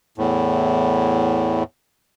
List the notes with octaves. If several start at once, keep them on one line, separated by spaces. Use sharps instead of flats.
E2 A2